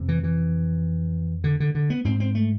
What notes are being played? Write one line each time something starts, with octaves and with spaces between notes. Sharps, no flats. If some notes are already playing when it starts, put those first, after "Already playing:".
Already playing: F2 C3
E3
E3
D3
D3
D3
B3
G#2 C4
C4
A3